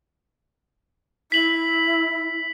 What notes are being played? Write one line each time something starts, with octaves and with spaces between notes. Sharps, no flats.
E4 B6 F#7